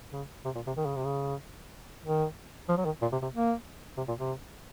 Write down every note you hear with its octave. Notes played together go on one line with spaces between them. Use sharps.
C#3
C3
A#2
C3
D#3
C#3
C3
C#3
D#3
F3
F#3
D#3
A#2
C3
C3
A#3
C3
A#2
C3